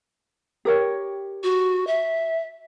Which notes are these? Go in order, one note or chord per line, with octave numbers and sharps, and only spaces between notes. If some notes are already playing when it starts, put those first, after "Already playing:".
G4 A#4 C#5
F#4
E5